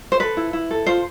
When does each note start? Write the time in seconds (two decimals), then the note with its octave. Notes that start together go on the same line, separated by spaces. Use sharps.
0.12 C5
0.20 A4 B4
0.37 E4
0.53 E4
0.71 A4
0.86 F4 C5